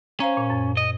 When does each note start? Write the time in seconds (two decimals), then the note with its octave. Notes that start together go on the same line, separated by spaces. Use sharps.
0.20 C#4 C5 F5 A#5
0.37 A#2
0.50 F#2
0.77 D#5